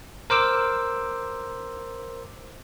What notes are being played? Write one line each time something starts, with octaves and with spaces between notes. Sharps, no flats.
A#4 C5 D6 E6